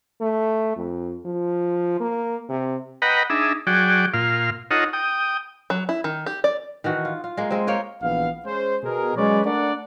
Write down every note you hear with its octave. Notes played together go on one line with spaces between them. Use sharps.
A3
F2
F3
A#3
C3
B4 D#5 F#5 G5 A#5 B5
D4 D#4 G#4 E5
F#3 F#4 G#4 D5 G5
A#2 F4 F5
D#4 F4 A4 C#5 D#5 F#5
G5 D#6
F#3
E4
D#3
G4
D5
D#3 E3 F#4
F4
F4
G#3 A#3
G#3 C4
A#3 C#5 G5
A#1 E3 B3 F5
G#3 C#4 C5
B2 G#4 A#4
F#3 G#3 C#4 B4 C#5 D5
A3 D4 A#4 D5 F#5